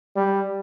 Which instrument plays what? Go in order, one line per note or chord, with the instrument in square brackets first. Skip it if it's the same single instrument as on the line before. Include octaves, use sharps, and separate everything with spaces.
[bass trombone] G3